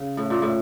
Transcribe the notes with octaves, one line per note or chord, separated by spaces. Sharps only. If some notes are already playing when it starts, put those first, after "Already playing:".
Already playing: C#3
A2
A#2
A2